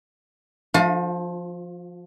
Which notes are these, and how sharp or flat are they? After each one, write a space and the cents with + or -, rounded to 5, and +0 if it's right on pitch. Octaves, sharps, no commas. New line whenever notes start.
F3 +0 F4 +40